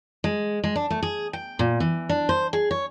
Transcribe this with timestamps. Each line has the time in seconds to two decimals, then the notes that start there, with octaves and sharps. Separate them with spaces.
0.24 G#3
0.64 G#3
0.76 D4
0.90 A3
1.03 G#4
1.33 G5
1.59 A#2
1.80 E3
2.09 D4
2.29 C5
2.53 G#4
2.71 C#5